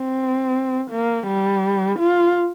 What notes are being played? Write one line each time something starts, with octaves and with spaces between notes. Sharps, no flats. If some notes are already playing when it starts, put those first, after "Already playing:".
Already playing: C4
A#3
G3
F4